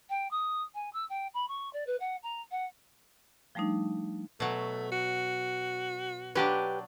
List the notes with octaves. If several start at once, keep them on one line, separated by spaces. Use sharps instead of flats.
G5
D#6
G#5
E6
G5
B5
C#6
D5
B4
F#5
A#5
F#5
F3 G3 A3 D4 D#4
B2 F#3 A3
F#4
F#3 D4 G4 B4